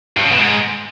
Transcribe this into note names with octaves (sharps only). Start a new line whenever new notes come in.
G2
C#3
B2
G#2